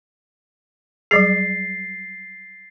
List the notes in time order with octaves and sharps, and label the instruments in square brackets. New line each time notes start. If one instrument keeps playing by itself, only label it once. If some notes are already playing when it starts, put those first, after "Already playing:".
[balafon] F#3 G3 G#4 [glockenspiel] A6 C7